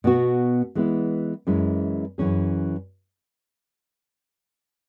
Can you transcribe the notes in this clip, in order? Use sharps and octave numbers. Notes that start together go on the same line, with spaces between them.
B2 B3 F#4
E3 G#3 B3 E4
F#2 E3 G#3 C#4 E4
F#2 E3 C#4 G#4